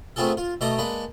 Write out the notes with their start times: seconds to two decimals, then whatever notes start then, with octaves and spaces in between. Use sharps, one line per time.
0.16 A3 B3 C4 F4 G#4 A4
0.37 F4
0.61 B2 A3 A4 D#5 A#5 D6
0.78 G#3 A#3 D4 B4